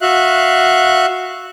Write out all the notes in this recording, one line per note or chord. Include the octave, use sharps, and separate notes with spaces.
F#4 E5 F5 F#6